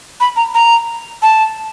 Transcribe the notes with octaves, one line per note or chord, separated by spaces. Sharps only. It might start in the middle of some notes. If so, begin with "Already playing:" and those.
B5
A#5
A#5
A5